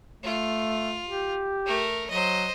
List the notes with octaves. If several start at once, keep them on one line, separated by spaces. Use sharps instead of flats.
A3 F4
G4
A3 A#4
F#3 C5 D#5